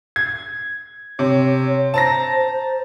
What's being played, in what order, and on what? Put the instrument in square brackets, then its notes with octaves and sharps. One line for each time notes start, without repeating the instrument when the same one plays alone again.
[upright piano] G#6
[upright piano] C3 [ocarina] C#5
[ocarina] C5 [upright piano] A5 A#5 A#6